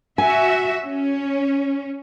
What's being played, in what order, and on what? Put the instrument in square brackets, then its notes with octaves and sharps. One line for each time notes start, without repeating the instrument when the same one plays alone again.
[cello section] F#4 E5 [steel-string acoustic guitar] G#5
[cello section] C#4